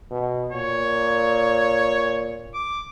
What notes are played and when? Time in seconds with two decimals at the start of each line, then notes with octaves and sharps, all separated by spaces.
0.11 B2
0.52 A#2 C#5
2.54 D6